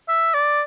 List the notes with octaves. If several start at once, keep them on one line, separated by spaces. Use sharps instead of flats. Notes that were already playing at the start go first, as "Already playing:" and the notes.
E5
D5